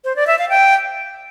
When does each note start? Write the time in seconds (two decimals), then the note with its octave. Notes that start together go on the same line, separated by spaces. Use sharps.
0.04 C5
0.16 D5
0.27 E5
0.39 F5
0.49 G5